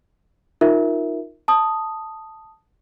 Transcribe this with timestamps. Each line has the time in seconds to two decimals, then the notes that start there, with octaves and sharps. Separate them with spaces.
0.61 D#4 F4 A#4 E5
1.48 A5 D#6